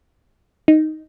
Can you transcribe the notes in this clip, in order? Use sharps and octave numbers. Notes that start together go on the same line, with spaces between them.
D#4